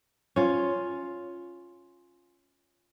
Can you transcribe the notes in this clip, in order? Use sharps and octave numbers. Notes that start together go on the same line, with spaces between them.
C#4 F4